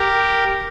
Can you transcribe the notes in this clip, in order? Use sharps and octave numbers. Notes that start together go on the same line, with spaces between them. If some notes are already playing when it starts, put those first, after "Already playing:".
Already playing: G4 A#4